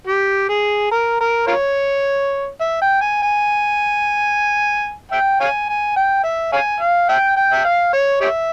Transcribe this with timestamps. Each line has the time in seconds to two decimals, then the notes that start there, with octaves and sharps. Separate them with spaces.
0.07 G4
0.49 G#4
0.91 A#4
1.20 A#4
1.47 F4 A#4 C#5
2.61 E5
2.82 G5
3.01 G#5
3.22 G#5
5.12 E5 G5
5.40 C#5 F5 G#5
5.69 G#5
5.96 G5
6.24 E5
6.52 C#5 F5 G#5
6.80 F5
7.09 E5 G5
7.37 G5
7.53 E5
7.65 F5
7.93 C#5
8.21 G4 C#5 E5